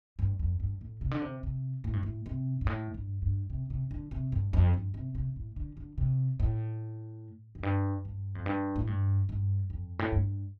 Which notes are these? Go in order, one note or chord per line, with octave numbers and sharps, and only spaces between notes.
G2
F2
G2
A2
C3
D3
C3
C3
A2
G2
A2
C3
G2
A2
G2
G2
C3
C3
D3
C3
G2
F2
G2
C3
C3
A2
D3
D3
C3
A2
F2
G2
G2
F2
G2
A2
G2
G2
F2
A2
G2